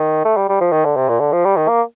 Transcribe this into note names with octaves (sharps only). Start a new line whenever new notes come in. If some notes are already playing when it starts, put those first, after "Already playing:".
Already playing: D#3
A3
G3
G3
F3
D#3
D3
C3
A#2
D3
F3
G3
D#3
A#3